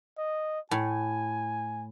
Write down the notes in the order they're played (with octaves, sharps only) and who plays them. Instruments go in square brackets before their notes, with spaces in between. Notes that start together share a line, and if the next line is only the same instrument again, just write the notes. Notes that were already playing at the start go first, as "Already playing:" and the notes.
[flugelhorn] D#5
[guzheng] A2 [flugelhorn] G#5